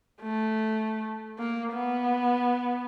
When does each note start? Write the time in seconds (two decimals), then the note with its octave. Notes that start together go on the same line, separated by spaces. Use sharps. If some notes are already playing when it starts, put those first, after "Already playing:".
0.22 A3
1.39 A#3
1.73 B3